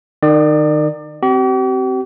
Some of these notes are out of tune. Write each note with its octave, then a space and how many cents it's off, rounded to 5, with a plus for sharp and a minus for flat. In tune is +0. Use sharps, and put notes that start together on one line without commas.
D#3 -25 D5 +30 D#6 +0
C4 +0 G4 -45